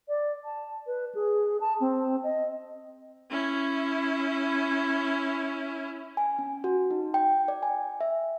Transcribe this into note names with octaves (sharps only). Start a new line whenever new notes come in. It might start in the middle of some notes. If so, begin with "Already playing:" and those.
D5
A5
B4
G#4
A5
C4
D#5
C#4 E4
G#5
C#4
F#4
D#4
G5
D5
G#5
E5